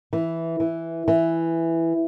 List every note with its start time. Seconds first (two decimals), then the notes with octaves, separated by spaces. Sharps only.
0.13 E3
0.60 E3
1.08 E3